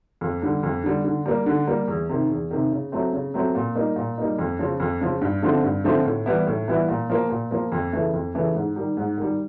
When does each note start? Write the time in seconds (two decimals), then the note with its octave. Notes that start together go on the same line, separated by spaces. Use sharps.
0.21 F2
0.42 D3 G3
0.63 F2
0.84 D3 G3
1.04 D3
1.26 G3 A#3
1.46 D3
1.67 G3 A#3
1.88 E2
2.09 C3 D#3
2.30 E2
2.51 C3 D#3
2.72 C#3
2.92 F#3 A3 C4
3.13 C#3
3.34 F#3 A3 C4
3.55 A#2
3.75 G3 A#3 D#4
3.96 A#2
4.18 G3 A#3 D#4
4.38 F2
4.59 C#3 F3
4.80 F2
5.01 C#3 F3
5.21 G2
5.43 D3 F3 A3 C4
5.63 G2
5.84 D3 F3 A3 C4
6.05 A2
6.26 E3 G3 B3 E4
6.47 A2
6.68 E3 G3 B3 E4
6.88 A#2
7.10 F3 A#3
7.30 A#2
7.51 F3 A#3
7.72 F2
7.93 C#3 E3 A3
8.13 F2
8.35 C#3 E3 A3
8.55 G#2
8.76 D#3 G3
8.97 G#2
9.17 D#3 G3